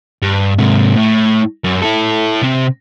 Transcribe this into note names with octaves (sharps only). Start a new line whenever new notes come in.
G2
G#2 C3
A2
F#2
E4 A4
C3 C4